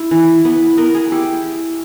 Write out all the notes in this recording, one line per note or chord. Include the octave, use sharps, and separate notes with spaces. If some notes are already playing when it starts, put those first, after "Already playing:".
Already playing: E4
E3
B3 B4
B3 A#4
G#4
E4 G4